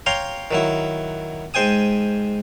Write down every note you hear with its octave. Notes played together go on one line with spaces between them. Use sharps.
C#5 F5 G5 A#5 C6
D#3 F#3 E4
G#2 C5 G5 G#5 D#6